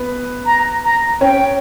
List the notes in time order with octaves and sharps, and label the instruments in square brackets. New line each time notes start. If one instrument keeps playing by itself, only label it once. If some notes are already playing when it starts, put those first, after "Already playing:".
Already playing: [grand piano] B3 B4
[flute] A#5
A#5
[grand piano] C#4 C#5 [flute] G5